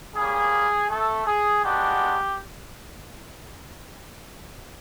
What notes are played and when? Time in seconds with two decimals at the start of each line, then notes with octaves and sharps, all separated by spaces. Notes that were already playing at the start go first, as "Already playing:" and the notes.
0.15 G3 A#3 C#4 G#4
0.88 A3 A4
1.26 G#4
1.62 G#3 B3 D4 F#4 G4